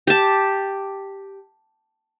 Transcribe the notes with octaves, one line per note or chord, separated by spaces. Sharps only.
G4 A5